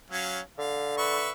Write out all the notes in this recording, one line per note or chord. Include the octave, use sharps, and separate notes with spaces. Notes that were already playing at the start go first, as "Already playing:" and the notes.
F#3 C#4 F5
D3 F5
B4 E5 C#6